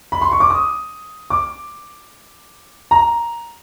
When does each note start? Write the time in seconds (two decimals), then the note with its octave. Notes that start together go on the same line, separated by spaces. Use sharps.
0.12 B5
0.21 C6
0.31 C#6
0.40 D6
0.50 D#6
1.30 D6
2.91 A#5